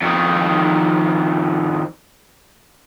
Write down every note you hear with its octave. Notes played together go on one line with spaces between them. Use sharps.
F2 D#3